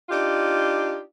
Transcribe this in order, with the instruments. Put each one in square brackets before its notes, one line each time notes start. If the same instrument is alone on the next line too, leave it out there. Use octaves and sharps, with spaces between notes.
[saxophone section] D4 D#4 F4 G4